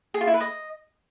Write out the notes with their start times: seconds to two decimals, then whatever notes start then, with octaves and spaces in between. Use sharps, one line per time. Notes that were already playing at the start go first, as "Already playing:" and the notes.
0.14 G#4
0.21 F4
0.27 E4
0.34 B4
0.40 D#5